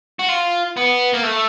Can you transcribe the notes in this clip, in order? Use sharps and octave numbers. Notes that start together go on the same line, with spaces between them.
F#4
F4
B3
A#3
A3